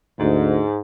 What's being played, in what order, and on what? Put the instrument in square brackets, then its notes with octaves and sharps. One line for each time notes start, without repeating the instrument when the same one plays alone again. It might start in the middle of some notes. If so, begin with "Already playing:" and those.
[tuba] D2 [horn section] G#2